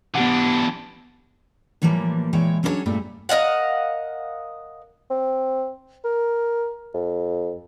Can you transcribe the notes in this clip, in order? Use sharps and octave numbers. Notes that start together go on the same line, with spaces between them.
E3 B3 D4 G4 F#5
A2 E3 F3 G3 A#3
A#2 E3 G#3 E4 C#5 G5
F#3 C#4 D4 E4 G#4 C#5
G2 A#2 G3 A3
A#4 D#5 F5 F#5
C4
A#4
F2